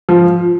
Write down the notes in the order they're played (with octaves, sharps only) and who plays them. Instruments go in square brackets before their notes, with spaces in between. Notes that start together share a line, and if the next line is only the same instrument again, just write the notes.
[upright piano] F3